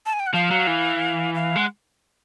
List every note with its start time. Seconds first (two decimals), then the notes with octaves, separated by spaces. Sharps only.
0.06 A5
0.13 G#5
0.20 G5
0.27 F#5
0.34 F3 F5
0.51 F#3
0.67 E3
1.35 F5
1.56 G#3 F#5